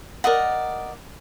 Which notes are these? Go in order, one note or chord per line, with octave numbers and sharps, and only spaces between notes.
A#4 D5 D#5 F#5